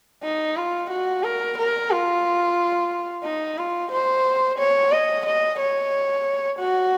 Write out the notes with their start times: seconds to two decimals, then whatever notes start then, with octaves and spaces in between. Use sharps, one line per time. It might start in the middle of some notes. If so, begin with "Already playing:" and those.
0.23 D#4
0.56 F4
0.90 F#4
1.23 A#4
1.58 A#4
1.91 F4
3.24 D#4
3.58 F4
3.92 C5
4.58 C#5
4.92 D#5
5.26 D#5
5.59 C#5
6.59 F#4